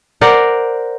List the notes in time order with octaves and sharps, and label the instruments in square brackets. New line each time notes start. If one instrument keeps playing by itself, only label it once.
[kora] A#4 C5 D5 F#5